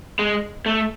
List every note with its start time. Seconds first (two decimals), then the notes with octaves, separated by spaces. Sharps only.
0.19 G#3
0.66 A3